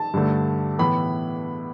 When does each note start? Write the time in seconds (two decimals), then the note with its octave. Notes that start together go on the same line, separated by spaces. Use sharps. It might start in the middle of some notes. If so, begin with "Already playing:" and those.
Already playing: A5
0.14 G2 D3 A3
0.79 A2 E3 B3 B5